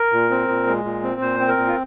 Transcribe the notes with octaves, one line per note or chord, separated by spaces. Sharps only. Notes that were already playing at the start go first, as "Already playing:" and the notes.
Already playing: A#4
A#2
C4
A#2
G#3
A#2
C4
A#2 C5
C4
A#4
A#2
F4